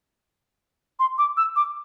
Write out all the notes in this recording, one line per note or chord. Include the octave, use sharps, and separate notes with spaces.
C6
D6
E6
D6